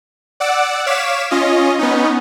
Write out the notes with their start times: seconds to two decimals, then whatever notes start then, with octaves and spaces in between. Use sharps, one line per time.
0.40 D5 F#5 D6 E6
0.86 C#5 F5 D6 B6 E7
1.31 C#4 F4 D#5
1.79 B3 C#4 D#4